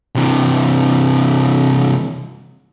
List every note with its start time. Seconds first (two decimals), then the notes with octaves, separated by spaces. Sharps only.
0.15 C3 E3